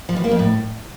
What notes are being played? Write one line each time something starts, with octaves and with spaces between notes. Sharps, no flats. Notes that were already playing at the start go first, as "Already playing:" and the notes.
F3
E3
A#3
F2
A2